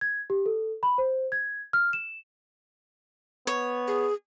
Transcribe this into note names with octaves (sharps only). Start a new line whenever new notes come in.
G#6
G4
A4
B5
C5
G#6
F6
E7
B3 C#5
G#4